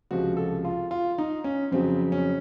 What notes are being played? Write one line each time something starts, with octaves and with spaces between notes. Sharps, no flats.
C#2 C3 F3 F#4
A4
F4
F4
D#4
C#4
F2 C#3 F#3 C4
C#4